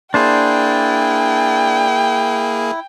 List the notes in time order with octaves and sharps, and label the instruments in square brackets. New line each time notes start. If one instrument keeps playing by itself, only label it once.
[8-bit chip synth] A#3 G#4 [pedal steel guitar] D4 C5 [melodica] E4 [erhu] G5